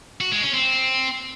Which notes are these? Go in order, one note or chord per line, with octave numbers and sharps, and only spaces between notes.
F#4
G#3
C#4
C4